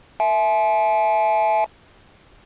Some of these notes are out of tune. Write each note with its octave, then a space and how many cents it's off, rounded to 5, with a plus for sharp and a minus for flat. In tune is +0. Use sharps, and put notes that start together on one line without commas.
E5 +0 G#5 +45